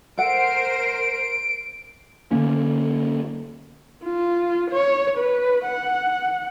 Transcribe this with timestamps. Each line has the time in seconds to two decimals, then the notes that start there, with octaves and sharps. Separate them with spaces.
0.18 A4 A#4 C5 F#5 D7
2.31 D3 F3 A#3 C#4
4.03 F4
4.70 C#5
5.17 B4
5.65 F#5